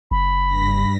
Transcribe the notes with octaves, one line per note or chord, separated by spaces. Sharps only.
F#1 B5
G2 A#6 B6